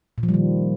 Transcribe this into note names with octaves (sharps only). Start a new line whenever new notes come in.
A#2
F3
G3
D#3